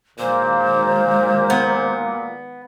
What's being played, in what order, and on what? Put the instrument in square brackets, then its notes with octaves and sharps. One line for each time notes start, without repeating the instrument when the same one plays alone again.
[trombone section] A#2 [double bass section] D#3 F#3 G#3 [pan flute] C5
[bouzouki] B3